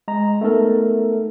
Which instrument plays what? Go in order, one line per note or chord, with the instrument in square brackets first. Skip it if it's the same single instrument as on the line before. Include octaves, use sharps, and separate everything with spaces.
[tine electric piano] G#3 G#4 A#5
A3 B3 D#4 A4 A#4